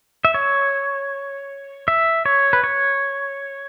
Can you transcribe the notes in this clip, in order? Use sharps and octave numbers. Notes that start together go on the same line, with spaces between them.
E5
C#5
E5
C#5
B4
C#5